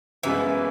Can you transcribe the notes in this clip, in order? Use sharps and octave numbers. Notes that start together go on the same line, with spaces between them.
F#1 F#2 C#3 E3 G#3 B3